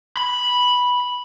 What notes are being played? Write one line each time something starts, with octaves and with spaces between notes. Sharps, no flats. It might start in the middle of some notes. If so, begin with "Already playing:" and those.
B5